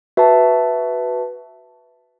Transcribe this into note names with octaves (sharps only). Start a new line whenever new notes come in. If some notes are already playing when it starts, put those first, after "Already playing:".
F#4 B4 E5 A5